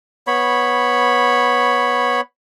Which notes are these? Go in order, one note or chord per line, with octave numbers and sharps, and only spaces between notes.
B3 C#5 B5